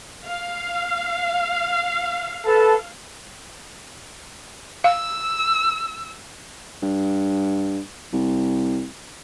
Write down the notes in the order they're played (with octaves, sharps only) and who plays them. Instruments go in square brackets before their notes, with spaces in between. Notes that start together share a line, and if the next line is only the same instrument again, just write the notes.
[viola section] F5
[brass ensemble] A4 B4 A5
[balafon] F5 [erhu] E6
[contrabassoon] G2
C2